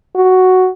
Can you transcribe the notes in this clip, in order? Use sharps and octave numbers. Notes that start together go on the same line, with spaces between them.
F#4